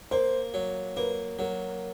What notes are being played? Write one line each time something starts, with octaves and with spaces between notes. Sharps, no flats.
A#3 C5
F#3
A#3 B4
F#3 A#4